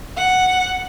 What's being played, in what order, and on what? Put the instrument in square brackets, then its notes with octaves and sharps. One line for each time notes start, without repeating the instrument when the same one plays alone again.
[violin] F#5